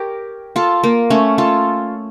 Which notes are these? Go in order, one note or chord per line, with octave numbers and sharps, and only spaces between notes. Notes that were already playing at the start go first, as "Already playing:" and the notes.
Already playing: G4 A#4 C#5
F4 A4
A#3
A3 C#4
F4 A4